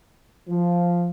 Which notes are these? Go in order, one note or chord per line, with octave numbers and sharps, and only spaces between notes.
F3